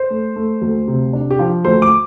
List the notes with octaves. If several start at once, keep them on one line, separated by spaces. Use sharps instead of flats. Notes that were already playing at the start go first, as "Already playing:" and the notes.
Already playing: C5
A3
A3
D2
C3
D4
G4
F3
D2 C5
D6